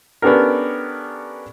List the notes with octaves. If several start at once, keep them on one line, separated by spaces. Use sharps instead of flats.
B3 C#4 D4 G4 A4 A#4